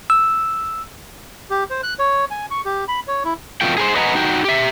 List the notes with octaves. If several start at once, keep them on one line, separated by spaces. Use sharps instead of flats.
E6
G4
C5
F#6
C#5
G#5
C#6
G4
B5
C#5
E4
F2 B2 F3 A3 F4 G5
G#4 A#4 C5
B4 D#5 F#5 G#5 A#5
D#4 F#4 G5
G4 E5